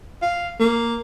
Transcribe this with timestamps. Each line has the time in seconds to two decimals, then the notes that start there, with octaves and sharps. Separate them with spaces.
0.22 F5
0.60 A#3